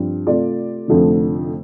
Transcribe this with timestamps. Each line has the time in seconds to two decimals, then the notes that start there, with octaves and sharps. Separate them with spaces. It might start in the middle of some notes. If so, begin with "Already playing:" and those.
Already playing: G2 F3 C4
0.27 C3 A3 F4 D5
0.88 F1 F2 D3 F3 A3